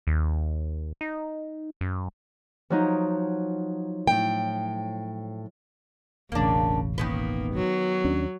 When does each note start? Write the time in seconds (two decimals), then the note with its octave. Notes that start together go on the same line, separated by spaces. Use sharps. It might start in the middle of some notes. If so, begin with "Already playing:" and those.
0.07 D#2
1.01 D#4
1.81 F#2
2.70 F3 F#3 D#4
4.07 A2 G5
6.32 E1 A1 C#3 A#3 D4
6.98 D#3 A#3 B3 B4
7.54 F#3
8.04 D#2 C#4 D4